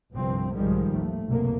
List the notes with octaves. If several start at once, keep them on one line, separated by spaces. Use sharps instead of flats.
G1 C2 G2 F3 C4
B1 G#2 D#3 F3 G3 G#3
A1 D#2 A3
F#1 C2 B2 D3 A#3